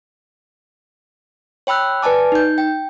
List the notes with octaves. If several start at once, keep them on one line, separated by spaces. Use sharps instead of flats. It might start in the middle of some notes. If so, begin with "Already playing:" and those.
C#5 G5 B5 E6 F#6
B4 D5 G#5 A5 D6
D#4 G6
G5